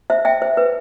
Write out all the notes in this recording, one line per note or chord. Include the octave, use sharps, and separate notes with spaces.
C5 E5
E5 G5
C5
B4